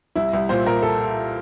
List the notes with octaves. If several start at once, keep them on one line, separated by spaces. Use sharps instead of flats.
C2 E4
C2
A#2 C5
A#2 A#4
A4